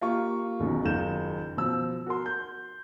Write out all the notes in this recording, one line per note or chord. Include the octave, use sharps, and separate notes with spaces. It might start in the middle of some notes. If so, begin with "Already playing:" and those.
A#3 F4 G4 C#6
F#1 F#2 B2 D#3
F#1 D#3 F4 G6 E7
B2 F3 E6
F#4 A#4 C6
G6